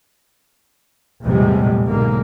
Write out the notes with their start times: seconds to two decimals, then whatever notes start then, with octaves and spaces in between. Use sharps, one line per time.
1.23 A#1 E2 A2 C3 G3 G#3
1.87 B1 G#2 D3 A#3